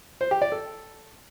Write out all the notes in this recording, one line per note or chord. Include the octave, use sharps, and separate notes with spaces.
C5
G4
D5
A4